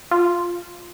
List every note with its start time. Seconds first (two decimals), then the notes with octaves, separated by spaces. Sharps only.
0.11 F4